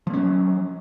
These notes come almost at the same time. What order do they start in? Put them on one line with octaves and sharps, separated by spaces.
F3 A#3 C#4 F#3